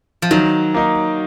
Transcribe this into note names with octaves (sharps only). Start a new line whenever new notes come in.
F3
D#3 F#3
A#3 D#4